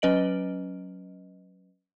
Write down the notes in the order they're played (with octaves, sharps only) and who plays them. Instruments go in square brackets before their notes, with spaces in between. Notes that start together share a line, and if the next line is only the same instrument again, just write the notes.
[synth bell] F#3 C#4 B4 D#5 D7 F#7